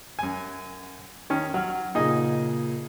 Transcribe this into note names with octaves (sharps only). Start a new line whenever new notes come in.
F#2 G#5
D#3 C#4
F#3 F#5 F6
A#2 C#3 D#4 G#4 D#5